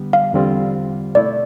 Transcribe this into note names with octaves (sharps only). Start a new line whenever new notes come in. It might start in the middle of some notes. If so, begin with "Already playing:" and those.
Already playing: D3 G3 B3
F5
E2 D3 G3 C4 F4
B2 A3 E4 D5